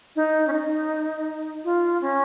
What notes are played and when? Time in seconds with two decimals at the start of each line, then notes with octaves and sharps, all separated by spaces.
0.16 D#4
0.48 C#4
0.53 D#4
1.64 F4
2.02 C#4